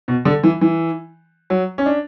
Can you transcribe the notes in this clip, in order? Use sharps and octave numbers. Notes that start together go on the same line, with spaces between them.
B2
D3
E3
E3
F#3
C#4
D4